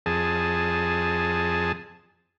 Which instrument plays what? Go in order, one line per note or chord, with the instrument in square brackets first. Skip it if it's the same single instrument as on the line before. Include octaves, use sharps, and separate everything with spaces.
[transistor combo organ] F2 G#4 A5